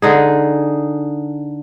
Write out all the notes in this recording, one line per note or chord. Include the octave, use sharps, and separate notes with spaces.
D3 D#4 G#4